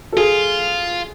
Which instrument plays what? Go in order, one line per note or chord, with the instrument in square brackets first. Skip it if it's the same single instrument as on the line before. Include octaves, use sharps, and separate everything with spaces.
[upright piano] A4
[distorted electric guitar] F4 [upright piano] G#4